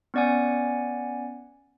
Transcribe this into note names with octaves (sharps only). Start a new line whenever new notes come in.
B3 C#4 D5 F#5 G#5